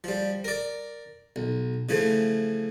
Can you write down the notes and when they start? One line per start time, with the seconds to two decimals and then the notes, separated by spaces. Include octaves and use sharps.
0.04 F3 G3
0.44 A#4 D5
1.36 B1
1.89 C#3 E3 F3 A3